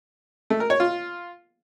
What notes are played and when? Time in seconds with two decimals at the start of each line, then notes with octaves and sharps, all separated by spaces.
0.50 A3
0.60 A#4
0.70 C#5
0.80 F4